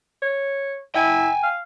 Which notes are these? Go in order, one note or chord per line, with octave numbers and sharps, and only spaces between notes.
C#5
E4 G5 G#5
F5